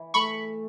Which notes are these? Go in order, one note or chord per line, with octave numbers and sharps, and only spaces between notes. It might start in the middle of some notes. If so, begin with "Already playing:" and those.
Already playing: E3
A3 B5 C#6